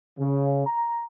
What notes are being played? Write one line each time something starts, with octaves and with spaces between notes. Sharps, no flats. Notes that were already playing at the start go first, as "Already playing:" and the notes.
C#3
A#5